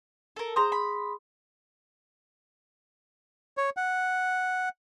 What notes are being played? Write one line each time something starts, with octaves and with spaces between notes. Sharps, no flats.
A4 A#4
G#4 C5 A#5 C6 D#6
B5
C#5
F#5